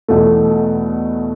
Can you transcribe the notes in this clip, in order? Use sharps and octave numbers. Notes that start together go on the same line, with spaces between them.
E2 B2 A3